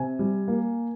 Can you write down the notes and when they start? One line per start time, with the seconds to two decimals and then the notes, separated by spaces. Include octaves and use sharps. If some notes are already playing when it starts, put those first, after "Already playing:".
Already playing: C3 G#5
0.19 G3
0.48 A#3